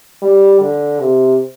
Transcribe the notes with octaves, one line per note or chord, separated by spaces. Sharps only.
G3
D3
C3